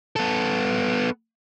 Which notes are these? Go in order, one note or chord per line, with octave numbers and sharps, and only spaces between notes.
B3 A4